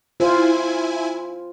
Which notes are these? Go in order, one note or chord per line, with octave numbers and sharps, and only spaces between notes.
E4 F4 C5 G#5